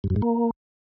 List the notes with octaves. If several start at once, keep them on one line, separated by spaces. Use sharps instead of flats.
G2
F#2
G#2
A#3